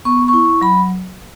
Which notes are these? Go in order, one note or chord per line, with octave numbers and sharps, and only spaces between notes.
B3 C#6
C#6
E4
F#3 B5